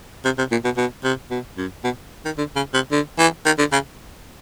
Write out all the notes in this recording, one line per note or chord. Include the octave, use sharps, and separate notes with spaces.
C3
C3
A#2
B2
B2
C3
B2
F#2
B2
D#3
D3
C#3
C3
D3
E3
D#3
D3
C#3